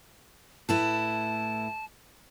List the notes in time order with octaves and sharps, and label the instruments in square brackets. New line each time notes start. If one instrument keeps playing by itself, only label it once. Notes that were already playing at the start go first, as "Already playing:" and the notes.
[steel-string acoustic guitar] A2 E4 B4 [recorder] A5